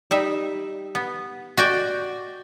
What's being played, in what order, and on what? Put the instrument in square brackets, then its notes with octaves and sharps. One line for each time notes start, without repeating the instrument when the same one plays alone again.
[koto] G3 D#4 E5
B3
[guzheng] F#4 D5 G5